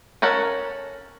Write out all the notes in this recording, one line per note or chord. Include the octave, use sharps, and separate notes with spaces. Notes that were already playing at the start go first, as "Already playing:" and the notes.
C#4 A4 A#4 F#5